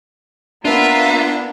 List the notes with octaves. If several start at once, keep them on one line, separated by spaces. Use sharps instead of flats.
A#3 B3 D4 F4 E5